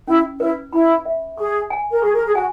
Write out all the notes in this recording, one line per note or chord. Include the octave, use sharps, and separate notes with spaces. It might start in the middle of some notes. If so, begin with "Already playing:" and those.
C#4 E4
E4 B4
E4 B5
E5
G#4 C#6
G#5
A#4
G#4 C#6
A#4
G#4
F#4 G#5